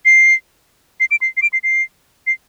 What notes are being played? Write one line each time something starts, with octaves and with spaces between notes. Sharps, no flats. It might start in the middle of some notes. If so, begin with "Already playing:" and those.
C7
C7
D7
C7
C7
D7
C7
C7
C7